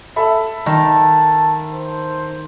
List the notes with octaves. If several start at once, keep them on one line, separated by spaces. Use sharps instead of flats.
A4 E5 B5
D#3 A5
C5